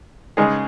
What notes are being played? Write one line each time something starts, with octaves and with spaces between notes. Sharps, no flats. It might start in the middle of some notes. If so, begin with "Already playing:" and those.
C#3 G#3 D#4 G#4